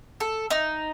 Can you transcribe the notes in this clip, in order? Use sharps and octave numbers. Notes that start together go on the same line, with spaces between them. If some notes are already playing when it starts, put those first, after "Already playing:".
A4
D#4